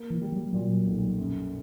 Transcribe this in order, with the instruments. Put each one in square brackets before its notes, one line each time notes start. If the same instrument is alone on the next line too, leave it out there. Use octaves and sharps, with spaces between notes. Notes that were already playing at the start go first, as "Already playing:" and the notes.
Already playing: [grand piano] A#3
[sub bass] E3
[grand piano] G3
[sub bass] F#3
[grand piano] A#2 [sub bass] F#3
[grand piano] B1
F#2